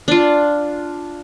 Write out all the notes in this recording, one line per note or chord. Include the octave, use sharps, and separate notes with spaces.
D4 F4